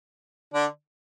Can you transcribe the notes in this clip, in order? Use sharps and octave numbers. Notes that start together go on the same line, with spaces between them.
D3 D4